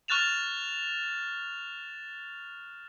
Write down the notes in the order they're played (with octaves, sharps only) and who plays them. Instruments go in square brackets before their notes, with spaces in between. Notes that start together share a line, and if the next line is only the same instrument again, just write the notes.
[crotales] C#6 F6 F#6 A6 E7 F7